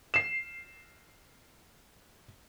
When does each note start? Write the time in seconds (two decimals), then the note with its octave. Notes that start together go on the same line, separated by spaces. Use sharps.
0.14 C7 E7